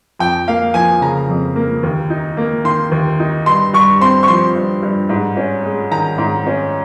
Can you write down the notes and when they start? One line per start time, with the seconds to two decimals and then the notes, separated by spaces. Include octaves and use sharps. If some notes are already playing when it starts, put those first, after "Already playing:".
0.19 F2 G5
0.48 A#3 F5
0.74 F3 G#5
1.01 C#3 A#5
1.29 F2
1.56 A#3
1.83 D#2
2.10 D#4
2.37 A#3
2.64 D#3 C6
2.92 D#2
3.20 D#4
3.46 G2 C6
3.74 G2 C#6
4.00 C4 C6
4.23 C#6
4.28 F3 C6
4.55 G2
4.83 G2
5.09 G#2
5.37 C#4
5.65 G#3
5.91 D#3 A#5
6.18 G#2
6.47 C#4